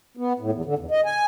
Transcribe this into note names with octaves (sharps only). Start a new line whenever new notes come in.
B3
A2
E2
D3
E2
D#5
G#5